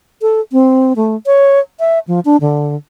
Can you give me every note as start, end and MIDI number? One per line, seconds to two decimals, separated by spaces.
0.22 0.41 69
0.52 0.93 60
0.96 1.16 57
1.26 1.60 73
1.80 1.99 76
2.08 2.20 53
2.25 2.37 62
2.41 2.75 50